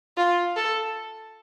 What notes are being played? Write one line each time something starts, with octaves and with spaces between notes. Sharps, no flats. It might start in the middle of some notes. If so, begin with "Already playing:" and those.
F4
A4